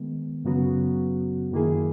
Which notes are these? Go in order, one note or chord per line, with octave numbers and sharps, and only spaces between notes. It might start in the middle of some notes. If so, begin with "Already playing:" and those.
Already playing: D#3 G#3 B3
F#2 C#3 F#3 B3 F#4
F#2 D#3 A#3 E4 G#4